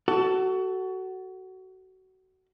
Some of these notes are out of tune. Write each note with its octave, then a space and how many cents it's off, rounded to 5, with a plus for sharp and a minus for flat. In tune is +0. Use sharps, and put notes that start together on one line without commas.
F#4 +25 A4 +0